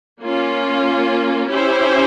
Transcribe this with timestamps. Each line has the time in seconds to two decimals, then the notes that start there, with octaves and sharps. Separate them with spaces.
0.21 A#3 C#4 F4
1.49 C#4 E4 G4 C5